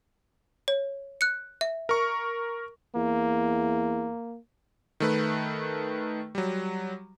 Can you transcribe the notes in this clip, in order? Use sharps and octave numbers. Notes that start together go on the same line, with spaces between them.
C#5
F#6 C#7
E5
A#4 C#6
E2 A#3
D#3 A3 B4
F#3 G3